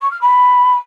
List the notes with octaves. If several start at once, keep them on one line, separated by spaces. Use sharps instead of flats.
C#6
F6
B5